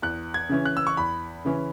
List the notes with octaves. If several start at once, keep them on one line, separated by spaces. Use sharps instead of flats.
E2 F#6
G#6
C#3 E3 C#4
F#6
E6
C#6
E2 B5
C#3 E3 C#4